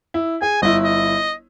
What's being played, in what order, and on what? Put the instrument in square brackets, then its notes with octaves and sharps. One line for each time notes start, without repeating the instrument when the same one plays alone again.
[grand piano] E4
[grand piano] G#4 [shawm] G#5
[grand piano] G1 E4 [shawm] D#5
[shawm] D#5